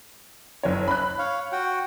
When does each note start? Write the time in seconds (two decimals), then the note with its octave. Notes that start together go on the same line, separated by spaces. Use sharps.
0.63 F#1 C#5
0.88 B5 F#6
1.19 C#5 F5
1.52 F#4 F#5 G5